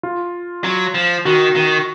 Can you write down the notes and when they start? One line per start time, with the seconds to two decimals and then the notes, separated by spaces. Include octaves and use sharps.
0.03 F4
0.64 F#3
0.94 F3
1.25 D#3 F#4
1.55 D#3